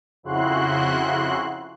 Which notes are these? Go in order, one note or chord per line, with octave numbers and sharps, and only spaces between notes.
F2 C#3 E4 F#4 C6 F#6